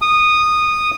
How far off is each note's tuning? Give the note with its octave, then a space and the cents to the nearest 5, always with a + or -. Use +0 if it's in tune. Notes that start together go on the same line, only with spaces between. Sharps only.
D#6 -15